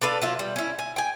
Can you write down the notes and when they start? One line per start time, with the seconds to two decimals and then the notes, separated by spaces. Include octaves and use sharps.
0.02 D4 A4 B4 F5
0.22 F#3 E4 F4
0.39 G3
0.56 C#4 E4
0.79 G#5
0.96 G5 G#5